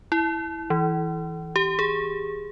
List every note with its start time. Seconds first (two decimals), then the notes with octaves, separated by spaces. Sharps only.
0.12 E4
0.70 E3
1.56 G4
1.79 G#4